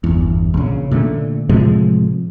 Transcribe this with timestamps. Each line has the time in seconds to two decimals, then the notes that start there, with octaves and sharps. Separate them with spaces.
0.04 G1 E2
0.54 A#1 C#3
0.91 A#2 D3 A3
1.49 A2 C3 F3 G#3